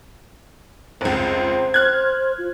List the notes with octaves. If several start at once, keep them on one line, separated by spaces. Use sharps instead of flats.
F1 C#2 C5
F6 F#6 G#6
F4